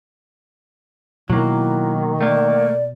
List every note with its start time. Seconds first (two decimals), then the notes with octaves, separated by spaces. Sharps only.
1.30 B2 D#3 F#3 A#3 E4
2.21 A3 A#3 D5